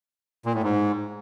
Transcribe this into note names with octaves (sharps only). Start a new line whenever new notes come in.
A#2
A2
G#2